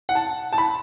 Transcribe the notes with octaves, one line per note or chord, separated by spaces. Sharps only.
F#5
A5
A5
B5